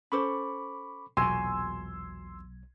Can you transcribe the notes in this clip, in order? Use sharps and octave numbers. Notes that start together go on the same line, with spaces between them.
C#4 A4 C5 B5 C#6 D6
E1 B1 A#2 F#4 G#5 C6 E6 G#6